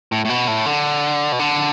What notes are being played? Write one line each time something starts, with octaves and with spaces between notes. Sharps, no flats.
A2
A2
B2
A2
D3
B2
D3